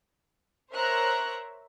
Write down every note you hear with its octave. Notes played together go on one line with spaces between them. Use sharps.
A#4 C5 C#5 E5 A#5 F#6